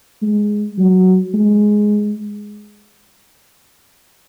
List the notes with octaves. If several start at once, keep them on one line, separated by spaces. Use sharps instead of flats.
G#3
F#3
G#3